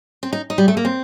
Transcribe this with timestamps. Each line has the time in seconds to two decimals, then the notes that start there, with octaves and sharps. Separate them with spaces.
0.23 C4
0.33 D#4
0.50 D#4
0.58 G3
0.68 A3
0.77 A#3
0.85 C4